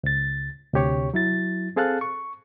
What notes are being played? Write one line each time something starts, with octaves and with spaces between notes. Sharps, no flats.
C#2 A6
D2 C3 G4 C#5 C#6
F#3 E4 A6
C4 G#4 A4 F5 A5 F#6
C#6